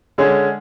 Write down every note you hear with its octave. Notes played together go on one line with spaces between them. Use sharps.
D3 G#3 C#4 G#4